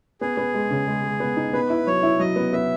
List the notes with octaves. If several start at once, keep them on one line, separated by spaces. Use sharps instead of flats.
B3 G#4
B3
G#3
C#3
G#3
G#3
B3
D#4
B3 B4
E4
F#3 C#5
E4
F#3 D#5
B3
B3 E5